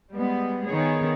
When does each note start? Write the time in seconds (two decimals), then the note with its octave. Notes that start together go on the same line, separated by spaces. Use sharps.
0.12 G3 G#3 B3
0.67 D#3 B3 G#4 C#5